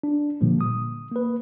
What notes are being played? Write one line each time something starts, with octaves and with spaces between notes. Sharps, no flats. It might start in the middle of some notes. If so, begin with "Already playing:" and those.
D4
A#2 D3 F3 G3 A#3
D#6
A#3 B4